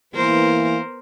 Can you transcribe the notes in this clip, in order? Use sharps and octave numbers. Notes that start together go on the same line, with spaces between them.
E3 A#3 B3 E4 A#4 C5